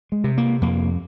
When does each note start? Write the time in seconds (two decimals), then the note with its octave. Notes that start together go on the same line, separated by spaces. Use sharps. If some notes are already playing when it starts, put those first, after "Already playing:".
0.12 G#3
0.24 C3
0.38 A#3
0.61 F2 A#3